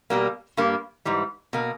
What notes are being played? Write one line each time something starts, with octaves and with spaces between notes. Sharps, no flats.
B2 G3 A#3
G2 G3 A#3
G#2 E3 G3
B2 A#3